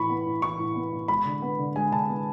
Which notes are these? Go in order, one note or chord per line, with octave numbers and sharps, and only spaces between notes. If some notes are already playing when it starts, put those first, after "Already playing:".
Already playing: A2 E3 B5 C#6
B3
A2
E3 C#6
A2
B3
A2
G#3 B5
D3
B3
D3
G#3 G#5
D3 A5
B3